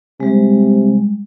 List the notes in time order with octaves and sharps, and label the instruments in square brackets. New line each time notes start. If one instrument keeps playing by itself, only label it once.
[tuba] C3 [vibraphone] G3 G#3